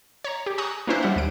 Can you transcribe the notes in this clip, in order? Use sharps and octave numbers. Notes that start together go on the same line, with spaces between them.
C#5 A#5
G4
G#5 A#5 C#6 D#6 F#6
A#3 C#4 D4 E4 B4 C5
G3 C#4 E5 F#5
D#2 D7